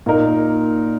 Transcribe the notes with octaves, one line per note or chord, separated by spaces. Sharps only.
A#2 A#3 D#4 A#4